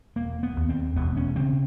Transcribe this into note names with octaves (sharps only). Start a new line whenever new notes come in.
E1 A#3
B3
D#2
C4
E1 B3
C#4
C#3 C4